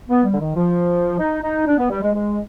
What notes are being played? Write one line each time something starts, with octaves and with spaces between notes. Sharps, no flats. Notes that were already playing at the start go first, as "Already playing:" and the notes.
B3
G3
D3
D#3
F3
D#4
D#4
D4
B3
G3
G#3
G#3